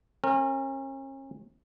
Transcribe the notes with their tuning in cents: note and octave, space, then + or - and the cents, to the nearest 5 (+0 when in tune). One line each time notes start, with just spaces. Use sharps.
C#4 -40 A#4 -20